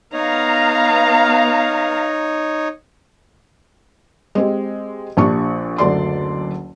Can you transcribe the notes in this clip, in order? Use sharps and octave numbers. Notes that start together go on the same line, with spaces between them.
B3 D#4 C#5 F5 A#5
G#3 C4 G4
A#1 A#2 D4 G4 C#6
F#1 D2 D3 D5 C6